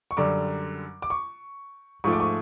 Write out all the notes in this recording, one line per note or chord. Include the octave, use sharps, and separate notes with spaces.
C#6
F#2 D3 G3 D6
D6
C#6
G#2 F3 A3 C#6
D6
C#6